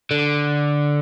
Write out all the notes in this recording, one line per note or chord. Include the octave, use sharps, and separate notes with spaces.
D3